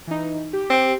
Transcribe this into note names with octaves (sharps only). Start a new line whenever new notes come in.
E3 D#4
G4
C4